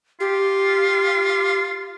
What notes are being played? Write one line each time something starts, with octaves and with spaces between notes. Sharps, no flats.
F4 G4